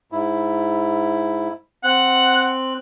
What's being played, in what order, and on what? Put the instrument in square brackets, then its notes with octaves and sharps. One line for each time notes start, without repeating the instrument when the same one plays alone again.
[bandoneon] G#2 E4
[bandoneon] C4 F#6 [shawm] F#5